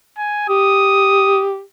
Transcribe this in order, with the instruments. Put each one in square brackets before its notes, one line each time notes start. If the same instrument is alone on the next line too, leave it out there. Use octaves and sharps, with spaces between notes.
[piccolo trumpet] G#5
[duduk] G4 [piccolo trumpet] D#6